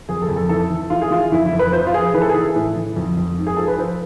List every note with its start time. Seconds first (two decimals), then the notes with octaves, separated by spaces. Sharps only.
0.09 F2 G#4
0.22 A4
0.29 F2
0.36 A4
0.49 E3 A4
0.70 E3
0.90 E3 F4
1.02 G#4
1.11 E3 F4
1.32 F2 E4
1.46 E4
1.52 F2
1.59 B4
1.73 F3 C5
1.87 F4
1.94 F3 G#4
2.14 E3 B4
2.22 A4
2.29 G#4
2.34 E3 A4
2.56 A2
2.76 E3
2.96 F2
3.17 F2
3.38 G#2
3.47 G#4
3.57 F3 A4
3.68 B4
3.78 F3 C5